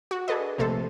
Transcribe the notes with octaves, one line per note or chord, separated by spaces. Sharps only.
F#4
D4 G#4 A4 B4 D#5
A#1 C3 A3 A4 C5